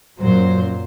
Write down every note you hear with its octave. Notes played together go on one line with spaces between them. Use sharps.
F#2 A#2 F#3 C5